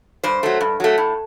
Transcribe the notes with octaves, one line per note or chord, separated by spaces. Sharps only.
G2 C5
F#3 A3
G2
F#3 A3
A2